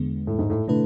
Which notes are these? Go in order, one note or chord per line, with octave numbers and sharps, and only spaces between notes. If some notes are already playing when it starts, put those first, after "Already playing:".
Already playing: E2 D3 G#3 B3
A2
G#2
A2
B2 D3 A3 E4 B4